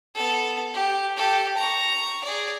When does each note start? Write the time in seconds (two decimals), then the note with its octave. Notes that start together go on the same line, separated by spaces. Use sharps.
0.15 B3 A4
0.74 G4
1.17 G4 A4
1.57 A#5 C#6
2.24 G#4 D5